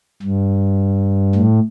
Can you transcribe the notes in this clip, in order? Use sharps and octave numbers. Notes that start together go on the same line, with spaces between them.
G2
A2